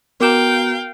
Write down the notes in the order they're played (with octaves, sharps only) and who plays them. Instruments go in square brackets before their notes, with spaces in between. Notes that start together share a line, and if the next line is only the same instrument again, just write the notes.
[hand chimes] B3 F#4 A#5 [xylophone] A#4 D6 E7 [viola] F5 G5